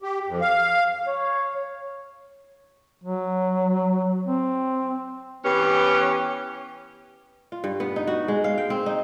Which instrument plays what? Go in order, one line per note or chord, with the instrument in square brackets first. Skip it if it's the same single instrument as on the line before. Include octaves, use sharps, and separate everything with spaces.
[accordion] G4
F2
F5
C#5
[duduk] F#3
C4
[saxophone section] E3 B3 C#4 G4
[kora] F4
G2
B3
D#4
F#4
G#3
F5
G5
C4
D#4